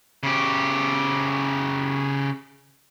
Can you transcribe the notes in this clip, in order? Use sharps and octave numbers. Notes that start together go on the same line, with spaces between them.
C#3 G4